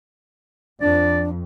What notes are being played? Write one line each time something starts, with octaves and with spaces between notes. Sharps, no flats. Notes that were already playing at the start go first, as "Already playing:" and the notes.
F2 D4 D5